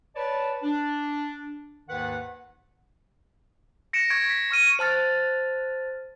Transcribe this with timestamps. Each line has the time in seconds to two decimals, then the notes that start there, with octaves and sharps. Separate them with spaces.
0.16 B4 C#5 D5 A5
0.63 D4
1.89 D#2 G#2 D#3 B4 F#5
3.93 A#6 C#7 D7 E7
4.10 C#6 G#6 D7
4.30 B6
4.51 C#6 F6 D#7
4.79 C5 A5 F6 A6